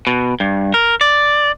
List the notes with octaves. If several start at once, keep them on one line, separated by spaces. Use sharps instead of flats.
B2
G2
A#4
D5